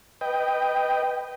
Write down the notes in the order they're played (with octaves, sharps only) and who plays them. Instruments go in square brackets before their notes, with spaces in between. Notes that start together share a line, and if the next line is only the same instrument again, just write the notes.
[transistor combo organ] B4 D#5 G5